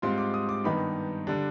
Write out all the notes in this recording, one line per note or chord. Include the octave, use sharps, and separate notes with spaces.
G#2 G3 C4 F4 C6
D6
D#6
D6
G2 D#3 B3 D#4 B5
D3 G3 D4